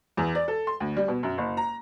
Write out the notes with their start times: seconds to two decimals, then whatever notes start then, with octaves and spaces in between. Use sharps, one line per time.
0.17 E2
0.35 D5
0.48 A4
0.67 C6
0.80 D2
0.97 G3
1.08 B2
1.23 F#2
1.38 F#1
1.57 A#5